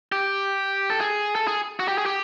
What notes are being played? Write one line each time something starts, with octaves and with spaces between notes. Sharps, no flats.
G4
A4
G#4
A4
G#4
F#4
G4
G#4
G4